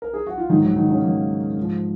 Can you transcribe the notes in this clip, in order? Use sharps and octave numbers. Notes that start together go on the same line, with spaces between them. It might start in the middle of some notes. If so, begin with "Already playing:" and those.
A#4
G#4
F#4
F4
G#2 D#3 F#3 D#4
F#3 F#4
D#3 D#4
C#3 C#4
G#2 F#3 A#3
G#2 F3